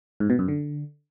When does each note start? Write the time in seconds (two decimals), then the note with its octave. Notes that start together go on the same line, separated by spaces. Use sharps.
0.20 G#2
0.30 B2
0.39 F#2
0.48 D3